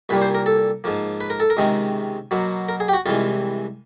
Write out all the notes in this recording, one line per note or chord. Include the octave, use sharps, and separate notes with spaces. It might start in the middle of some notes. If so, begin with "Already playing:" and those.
C2 A#2 G3 A#3 B4
C5
A#4
A4
G#2 F3 A#3
B4
A#4
A4
A#4
C#2 C3 D#3 G#3
B2 F#3 A#3
A#4
G#4
G4
F#4
C2 C3 E3 G#3 F4